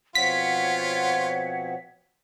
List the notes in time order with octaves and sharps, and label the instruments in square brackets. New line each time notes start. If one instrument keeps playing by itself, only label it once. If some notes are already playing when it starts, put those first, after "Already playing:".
[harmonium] B2 F3 C4 [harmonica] F4 [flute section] C#5 F#5 [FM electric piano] B6